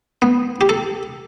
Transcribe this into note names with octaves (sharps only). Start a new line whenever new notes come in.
B3
G4
A4